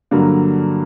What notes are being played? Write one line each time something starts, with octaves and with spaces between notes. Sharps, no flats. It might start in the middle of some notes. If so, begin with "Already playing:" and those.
G2 D3 F#3 A#3